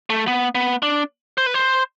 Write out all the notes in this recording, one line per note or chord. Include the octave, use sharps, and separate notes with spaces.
A3
B3
B3
D4
C5
B4
C5